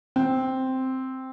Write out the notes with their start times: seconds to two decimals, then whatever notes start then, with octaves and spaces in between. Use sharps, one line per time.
0.16 C4